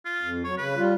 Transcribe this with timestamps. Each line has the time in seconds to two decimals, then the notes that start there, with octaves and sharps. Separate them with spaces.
0.05 F4
0.21 F2
0.44 F#3 C#5
0.58 C#3 B4
0.76 G3 F4